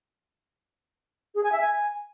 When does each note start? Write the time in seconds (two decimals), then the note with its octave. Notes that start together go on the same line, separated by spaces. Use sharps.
1.35 G#4
1.44 G#5
1.52 E5
1.61 G#5